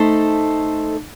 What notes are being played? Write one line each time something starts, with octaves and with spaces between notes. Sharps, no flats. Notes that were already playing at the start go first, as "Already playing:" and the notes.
Already playing: A3 D#4 A4 C5